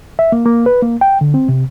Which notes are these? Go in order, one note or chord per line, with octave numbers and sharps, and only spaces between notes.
E5
A#3
A#3
B4
A#3
G5
D3
C4
C3